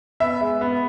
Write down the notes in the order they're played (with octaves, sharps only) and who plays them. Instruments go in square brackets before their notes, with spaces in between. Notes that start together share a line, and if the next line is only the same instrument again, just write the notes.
[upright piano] B3 E5
G#3
B3